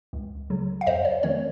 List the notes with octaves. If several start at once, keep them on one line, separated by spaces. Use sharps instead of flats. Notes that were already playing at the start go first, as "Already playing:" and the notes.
C#2
C#3 F#3
F5
F2 C5 D#5
C#5
D#3 A3 C4 C#5